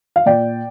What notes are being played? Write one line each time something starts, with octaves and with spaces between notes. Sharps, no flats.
F5
A#2 D5 G5